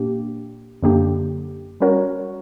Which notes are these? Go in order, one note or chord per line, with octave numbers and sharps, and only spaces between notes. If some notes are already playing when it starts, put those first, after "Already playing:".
Already playing: A#2 A#3 D4 G4
F#2 D3 A#3 D4 G4
G3 C#4 F#4 A#4 C#5